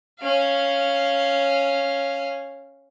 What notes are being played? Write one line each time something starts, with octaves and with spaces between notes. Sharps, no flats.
C#4 F5